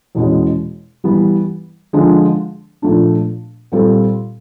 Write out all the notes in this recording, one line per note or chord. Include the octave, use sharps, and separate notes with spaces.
E2 B2 G#3 C#4
E3 G3 B3
D3 F3 G#3
A#2 F3 A3 D4
A#2 G3 C4 F4 A4